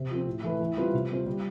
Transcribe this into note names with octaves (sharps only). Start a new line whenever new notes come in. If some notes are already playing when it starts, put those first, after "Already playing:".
Already playing: C3
F3 C4
A2
E3 A3 E4 B4
E3
G3 C4 F4 B4
C3
G3 C4 F4 C5
G3